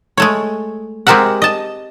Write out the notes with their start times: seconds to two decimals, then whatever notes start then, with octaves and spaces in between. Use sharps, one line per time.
0.18 G#3 A3 C#5
1.07 G#3 C4 G4 A#4 E5 F#5
1.42 D#5 A5